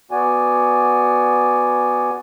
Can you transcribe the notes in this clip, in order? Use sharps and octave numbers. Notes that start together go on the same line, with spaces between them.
B3 F#4 D5 G#5